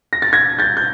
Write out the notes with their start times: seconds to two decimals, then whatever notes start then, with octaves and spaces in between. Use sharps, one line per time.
0.13 A#6
0.22 A6
0.33 G#6 A#6
0.59 G6 A6
0.77 G6